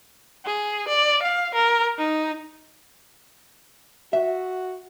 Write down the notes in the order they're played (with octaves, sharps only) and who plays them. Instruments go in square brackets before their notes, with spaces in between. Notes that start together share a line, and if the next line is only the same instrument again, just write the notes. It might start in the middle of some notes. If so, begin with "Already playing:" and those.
[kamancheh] G#4
D5
F5
A#4
D#4
[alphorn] F#4 [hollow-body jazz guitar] E5